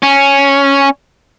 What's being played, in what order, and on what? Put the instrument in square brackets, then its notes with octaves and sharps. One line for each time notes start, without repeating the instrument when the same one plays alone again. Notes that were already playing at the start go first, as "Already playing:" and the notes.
[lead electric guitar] C#4